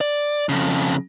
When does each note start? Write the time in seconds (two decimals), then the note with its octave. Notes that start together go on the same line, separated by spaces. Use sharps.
0.01 D5
0.49 F2 C#3